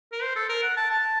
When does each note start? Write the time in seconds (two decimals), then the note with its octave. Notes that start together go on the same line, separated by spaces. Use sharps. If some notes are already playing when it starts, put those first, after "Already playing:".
0.12 A#4
0.22 C5
0.36 A4
0.49 A#4
0.63 F#5
0.77 A5
0.90 A5